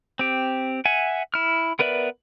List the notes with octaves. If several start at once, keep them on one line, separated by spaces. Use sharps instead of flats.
C4 G4
E5 F#5 G#5
E4 F6
B3 A#4 B4 D5 E5